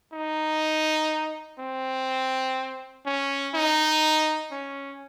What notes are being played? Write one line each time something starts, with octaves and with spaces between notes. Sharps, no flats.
D#4
C4
C#4
D#4
C#4